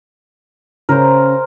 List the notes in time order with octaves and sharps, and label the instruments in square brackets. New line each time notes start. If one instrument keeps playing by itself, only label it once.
[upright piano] C#3 [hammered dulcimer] A#4 C5